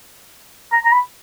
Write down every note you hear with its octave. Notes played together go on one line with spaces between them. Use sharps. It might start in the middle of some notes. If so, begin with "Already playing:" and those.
A#5
A#5
B5